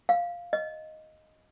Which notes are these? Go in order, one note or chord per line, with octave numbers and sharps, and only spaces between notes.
F5
D#5